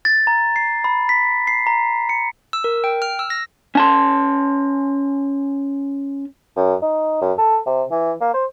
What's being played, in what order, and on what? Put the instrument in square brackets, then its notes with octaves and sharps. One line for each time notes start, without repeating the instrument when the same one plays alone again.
[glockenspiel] A6
A#5
C7
B5
B6
C7
A#5
C#7
[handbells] E6
A#4
G5
F6
E6
A#6
[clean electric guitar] C#4 A5 C6
[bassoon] F#2
D#4
F#2
A4
C3
E3
A#3
C5